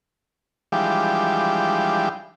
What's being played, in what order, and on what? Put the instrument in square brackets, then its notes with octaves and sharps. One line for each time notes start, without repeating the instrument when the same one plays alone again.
[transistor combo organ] E3 F3 G3 G#3 D4 G4